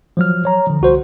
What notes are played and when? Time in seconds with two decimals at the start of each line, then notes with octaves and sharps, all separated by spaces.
0.17 F3 F#3 F6
0.45 C#5 A#5
0.67 D3 F3
0.81 C2 F#4 C5